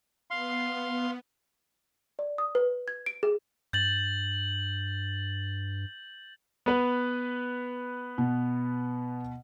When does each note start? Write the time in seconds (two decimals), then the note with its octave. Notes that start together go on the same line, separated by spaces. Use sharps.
0.31 B3 F5 C6
2.19 D5
2.38 D#6
2.55 B4
2.88 G#6
3.06 D7
3.23 G#4
3.73 G2 G6 A6 F#7
6.66 B3 B4
8.18 B2